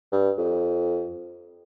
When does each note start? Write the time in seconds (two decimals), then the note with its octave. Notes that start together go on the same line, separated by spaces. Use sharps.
0.12 G2
0.38 F2